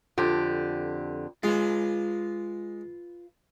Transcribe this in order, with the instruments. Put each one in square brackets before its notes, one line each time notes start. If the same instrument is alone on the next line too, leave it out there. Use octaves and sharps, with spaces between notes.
[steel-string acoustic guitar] F2 D3 G4
[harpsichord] G#3 [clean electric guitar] F4 B4